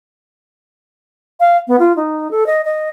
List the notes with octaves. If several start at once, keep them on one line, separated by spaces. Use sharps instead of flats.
F5
B3
F4
D#4
A4
D#5
D#5